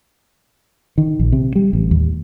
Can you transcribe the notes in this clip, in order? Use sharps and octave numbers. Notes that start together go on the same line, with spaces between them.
D#3
A#1
C3
G3
A1
D#2